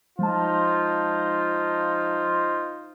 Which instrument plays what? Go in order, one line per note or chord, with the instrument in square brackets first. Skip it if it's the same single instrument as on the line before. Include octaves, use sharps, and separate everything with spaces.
[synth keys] F3 G#3 A5 [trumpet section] D#4 F4 C5